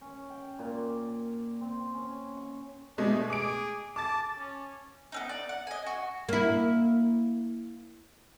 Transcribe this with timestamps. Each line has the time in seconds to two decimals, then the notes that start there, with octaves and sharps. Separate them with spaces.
0.01 C#4
0.30 G5
0.59 A#2
0.74 D6
1.61 C4
1.94 C#4
2.37 C#6
2.98 B2 G#3 A3 D4
3.30 G#4 D6 D7
3.96 A5 D6 A6
4.38 C#4
5.12 B3 C4 D#4
5.29 D5
5.49 F#5
5.67 D#5 G#5
5.86 F#4
6.29 A#3 E4